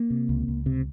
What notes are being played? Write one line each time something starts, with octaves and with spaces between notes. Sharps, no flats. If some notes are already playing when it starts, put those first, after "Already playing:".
Already playing: A#3
C3
C#2
C#2
C3